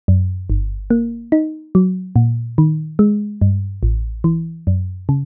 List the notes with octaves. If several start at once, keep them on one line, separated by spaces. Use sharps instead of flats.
F#2
G1
A#3
D#4
F#3
A#2
D#3
G#3
G2
A1
E3
F#2
C#3